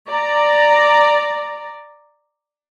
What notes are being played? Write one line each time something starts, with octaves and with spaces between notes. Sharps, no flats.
D5 A#5